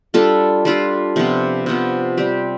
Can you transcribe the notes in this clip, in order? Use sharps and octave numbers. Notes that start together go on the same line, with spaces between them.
G3 D4 F4 A4
G3 D4 F4 A4
C3 F3 B3 F4
C3 F3 B3 F4
G3 C4 G4